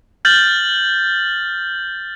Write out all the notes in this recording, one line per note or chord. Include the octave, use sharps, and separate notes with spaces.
F6 G6 A6 F#7